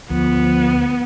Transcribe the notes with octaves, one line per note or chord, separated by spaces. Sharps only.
D2 F3 B3